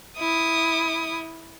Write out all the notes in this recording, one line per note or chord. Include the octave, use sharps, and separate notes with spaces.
E4 D#6